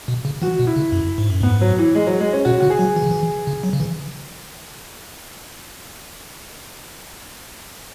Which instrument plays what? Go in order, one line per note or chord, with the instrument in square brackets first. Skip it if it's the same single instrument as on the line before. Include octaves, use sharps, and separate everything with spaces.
[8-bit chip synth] B2
C#3
[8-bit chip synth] E3 [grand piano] F#4
[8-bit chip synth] B2
[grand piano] E4
[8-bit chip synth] C#3
F#2
G#2
F#2
[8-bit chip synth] G#2 [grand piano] B3
[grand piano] F#3
E3
G#3
F#3
G#3
C#4
[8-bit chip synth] B2 [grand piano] F#4
[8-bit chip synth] C#3 [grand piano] F#4
[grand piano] G#4
[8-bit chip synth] F#3
E3
C#3
E3
C#3
F#3
C#3
E3